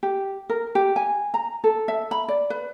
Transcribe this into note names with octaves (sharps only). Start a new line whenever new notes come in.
G4
A#4
G4
G#5
A#5
A4
E5
B5
D5
B4